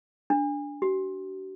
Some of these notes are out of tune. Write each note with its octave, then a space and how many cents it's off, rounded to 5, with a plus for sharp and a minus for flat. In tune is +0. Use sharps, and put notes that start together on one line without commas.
D4 -10
F#4 +45